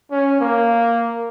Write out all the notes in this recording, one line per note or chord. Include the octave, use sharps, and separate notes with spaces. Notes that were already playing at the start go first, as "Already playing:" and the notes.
C#4
A#3